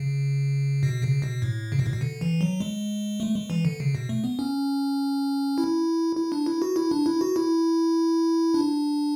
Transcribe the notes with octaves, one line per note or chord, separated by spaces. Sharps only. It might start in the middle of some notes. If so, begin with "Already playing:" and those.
Already playing: C#3
B2
C#3
B2
A2
C#3
B2
A2
B2
D3
E3
F#3
G#3
A3
G#3
E3
D3
C#3
B2
A3
B3
C#4
E4
E4
D4
E4
F#4
E4
D4
E4
F#4
E4
D4